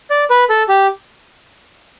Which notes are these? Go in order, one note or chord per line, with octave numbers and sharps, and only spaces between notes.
D5
B4
A4
G4